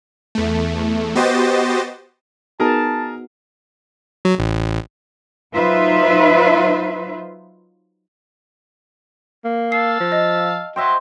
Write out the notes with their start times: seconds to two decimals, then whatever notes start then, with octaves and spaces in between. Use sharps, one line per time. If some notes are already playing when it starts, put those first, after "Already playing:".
0.35 E2 A3
1.15 B3 F#4 G4 C5 D#5 A6
2.60 B3 D#4 F#4 G#4 A#4 A5 A#5
4.25 F#3
4.39 A1
5.54 F#3 D#4 F4 B4 C5 E5
9.45 A#3
9.72 F5 A5 E6 C7
10.00 F3
10.12 D#5
10.76 F#3 C5 D#5 E5 G5